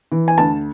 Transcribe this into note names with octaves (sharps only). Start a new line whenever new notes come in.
E3
G#5
D2 A5